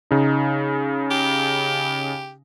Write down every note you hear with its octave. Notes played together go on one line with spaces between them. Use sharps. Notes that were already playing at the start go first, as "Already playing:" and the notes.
C#3 D#4
G4